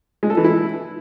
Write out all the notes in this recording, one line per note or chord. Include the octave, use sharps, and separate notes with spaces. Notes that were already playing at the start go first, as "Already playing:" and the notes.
G#3
A4
E3
E4